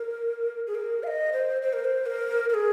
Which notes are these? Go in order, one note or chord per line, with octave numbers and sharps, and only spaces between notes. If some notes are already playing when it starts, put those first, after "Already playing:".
Already playing: A#4
G#4
A#4
F5
D#5
C5
C5
A#4
C5
A#4
A#4
G#4